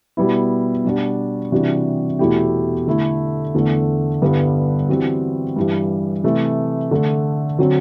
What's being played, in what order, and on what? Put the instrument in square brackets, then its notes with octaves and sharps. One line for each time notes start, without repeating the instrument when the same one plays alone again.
[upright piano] B2 G3 B3 E4
B2 G3 D4 F#4
C3 E3 G3 D4 F#4
E2 B2 A3 E4 G4
D3 A3 E4
E2 D3 A3
G2 D3 G3 B3 E4
E3 G3 C4 F#4
G2 E3 G3
C3 E3 A3
D3 A3 D4
D3 F#3 C4 F#4